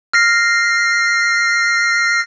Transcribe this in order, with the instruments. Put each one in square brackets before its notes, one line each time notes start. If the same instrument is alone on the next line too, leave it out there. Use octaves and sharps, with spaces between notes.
[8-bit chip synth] F6 A#6 C7